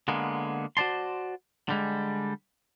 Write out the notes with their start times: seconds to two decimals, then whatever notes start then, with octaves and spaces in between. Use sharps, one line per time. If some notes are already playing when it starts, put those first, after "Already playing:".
0.08 D3 G#3 A#3 B3
0.77 F#4 C5 D5 A5 C6
1.69 D3 G3 G#3